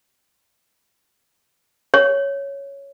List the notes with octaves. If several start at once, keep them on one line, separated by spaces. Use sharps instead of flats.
C#5